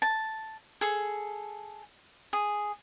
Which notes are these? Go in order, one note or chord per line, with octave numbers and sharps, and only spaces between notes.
A5
G#4 A4
G#4